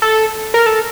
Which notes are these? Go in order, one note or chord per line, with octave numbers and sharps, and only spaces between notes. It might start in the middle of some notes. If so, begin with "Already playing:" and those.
A4
A#4
A4